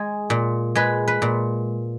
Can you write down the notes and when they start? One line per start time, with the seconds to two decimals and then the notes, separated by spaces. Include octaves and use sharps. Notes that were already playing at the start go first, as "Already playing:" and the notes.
Already playing: G#3 G#4
0.30 A#2
0.75 G#3 B4
1.08 B4
1.22 A#2